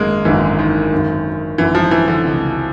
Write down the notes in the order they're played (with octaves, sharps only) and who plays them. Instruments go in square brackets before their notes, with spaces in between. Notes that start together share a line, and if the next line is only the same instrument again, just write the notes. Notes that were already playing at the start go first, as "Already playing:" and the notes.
Already playing: [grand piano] G#1 F#2 D3 [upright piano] G#3 A#3
[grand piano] G#1 F#2 D3 [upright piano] E3
[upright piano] D#3
[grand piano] G#1 F#2 D3
[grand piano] G#1 F#2 D3 [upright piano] E3
[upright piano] F3
E3
D3
[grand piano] C#2 C3 F3